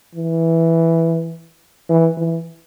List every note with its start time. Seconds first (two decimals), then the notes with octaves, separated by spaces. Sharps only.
0.15 E3
1.89 E3
2.17 E3